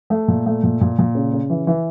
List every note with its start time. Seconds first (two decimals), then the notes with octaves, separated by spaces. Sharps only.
0.10 A3
0.28 A#2
0.46 A3
0.63 A#2
0.81 A#2
0.99 A#2
1.15 C#3
1.33 C#3
1.50 E3
1.67 E3